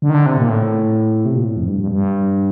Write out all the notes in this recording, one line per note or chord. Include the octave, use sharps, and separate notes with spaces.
D3
D#3
D3
C3
A#2
A2
C3
A#2
A2
F2
G2
G2
G2